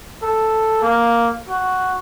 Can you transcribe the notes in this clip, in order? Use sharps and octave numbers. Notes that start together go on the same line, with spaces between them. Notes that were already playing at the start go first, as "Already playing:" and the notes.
A4
A#3
F#4